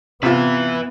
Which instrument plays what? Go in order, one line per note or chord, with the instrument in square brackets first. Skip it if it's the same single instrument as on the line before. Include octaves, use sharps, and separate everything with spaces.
[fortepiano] C3 F4 [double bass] B3 [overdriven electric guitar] B4 E5